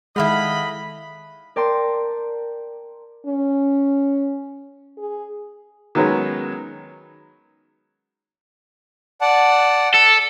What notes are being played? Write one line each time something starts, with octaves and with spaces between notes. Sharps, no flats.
D#3 G#3 E4 A4 D#5 F5 F#5 B5
A#4 D5 G5 A5 C6
C#4
G#4
D#3 F#3 G#3 B3 C#4 C#5
D5 F#5 A5
A4